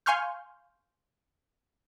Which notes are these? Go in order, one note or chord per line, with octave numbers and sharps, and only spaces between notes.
F5 G#5 C6 C#6 F6 G6